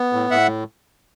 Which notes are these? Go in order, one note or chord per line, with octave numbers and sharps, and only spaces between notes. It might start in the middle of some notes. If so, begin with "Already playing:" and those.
Already playing: B3
A2
A2 E5 F#5